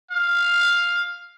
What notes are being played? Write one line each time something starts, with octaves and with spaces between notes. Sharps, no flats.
F5